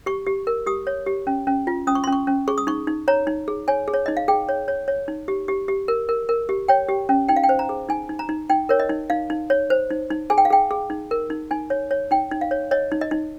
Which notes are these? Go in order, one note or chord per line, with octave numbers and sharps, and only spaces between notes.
G4 C#6
G4
A#4
G4 D#6
C#5
G4
C#4
C#4
F4
C#4 D#6
C#6
C6
C#4
C#6
C#4
G#4 C#6
D#6
D#4 C#6
D#4
C#5 A#5
D#4
G#4
C#5 G#5
G#4
C#5
D#4 D#5
F5
G#4 G5
C#5
C#5
C#5
D#4
G4
G4
G4
A#4
A#4
A#4
G4
C#5 G5
G4
C#4
D#4 G5
F5
G5
C5
A#5
G#4
D#4 G#5
D#4
A#5
D#4
D#4 G5
A#4 C#5
D#5
D#4
D#4 F5
D#4
C#5
C5
D#4
D#4
G#4 G#5
G5
F5
G#4 G5
G#4
D#4
A#4
D#4
D#4 G#5
C#5
C#5
D#4 G5
D#4
F5
C#5
C#5 D#5
D#4
D#5
D#4